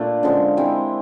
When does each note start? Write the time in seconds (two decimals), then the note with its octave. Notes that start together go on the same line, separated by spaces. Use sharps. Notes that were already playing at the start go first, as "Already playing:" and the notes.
Already playing: A#2 A3 D4
0.23 D3 F3 G#3 C#4
0.57 G#3 C4 E4 G4